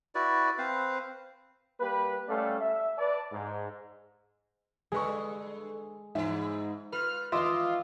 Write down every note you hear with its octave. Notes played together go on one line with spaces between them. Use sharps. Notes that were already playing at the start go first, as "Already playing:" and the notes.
E4 F#4 B4 D5
C4 B4 C5 F5
G3 A#3 G4 B4
G3 A3 C#4 A4 D5 F5
E5
B4 D5 A5
G#2
G2 G#3 G#4 A4 B4 C#6
G#2 E3 E4 E5
F4 B4 F6
D#3 F4 B4 D#5 E5 C6 D6 D#6